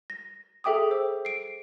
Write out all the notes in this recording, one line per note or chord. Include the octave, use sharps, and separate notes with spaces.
A#6
G#4 A4 E5 G5 D6 D#6
C5 E6
C7 D7